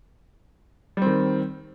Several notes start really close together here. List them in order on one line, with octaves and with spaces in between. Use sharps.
G3 C4 D#3